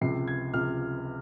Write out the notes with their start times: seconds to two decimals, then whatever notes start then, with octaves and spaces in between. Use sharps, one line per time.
0.01 C#2 C3 F3 C7
0.28 G#6
0.54 C#2 C3 F3 F6